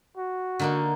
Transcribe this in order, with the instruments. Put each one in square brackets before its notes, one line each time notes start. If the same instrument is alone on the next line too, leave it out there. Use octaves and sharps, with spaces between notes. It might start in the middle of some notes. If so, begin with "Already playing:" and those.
[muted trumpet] F#4
[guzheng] D3 A#3 D#4